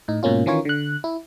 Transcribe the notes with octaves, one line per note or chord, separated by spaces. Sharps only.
A2 D#4
G#2 B2 A#3 C#4 F4
D#3 E3 C#4 F4 A#4 C#5
D3 F#6
E4